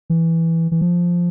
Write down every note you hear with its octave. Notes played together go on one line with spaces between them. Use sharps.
E3
E3
F3